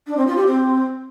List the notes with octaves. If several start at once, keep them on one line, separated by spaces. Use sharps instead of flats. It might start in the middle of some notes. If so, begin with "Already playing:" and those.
D4
C4
F4
G4
C4